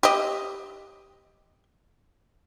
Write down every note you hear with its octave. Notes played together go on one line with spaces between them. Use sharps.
G4 D#5